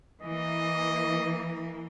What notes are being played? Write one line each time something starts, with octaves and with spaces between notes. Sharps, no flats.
E3 A#3 D#5